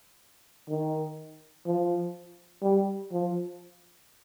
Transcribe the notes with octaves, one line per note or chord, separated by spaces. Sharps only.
D#3
F3
G3
F3